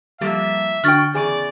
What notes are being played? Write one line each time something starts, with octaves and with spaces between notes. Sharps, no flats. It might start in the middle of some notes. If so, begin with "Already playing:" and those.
F3 G3 A#3 A4 E5
D3 D4 F#4 G5 F6 A6
E2 C#3 G#4 D5 G#5